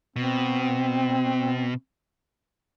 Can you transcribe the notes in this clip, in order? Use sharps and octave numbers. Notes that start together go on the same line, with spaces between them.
B2 C4